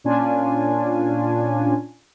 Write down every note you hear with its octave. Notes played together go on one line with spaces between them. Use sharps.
A#2 C#4 D4 F4 G#5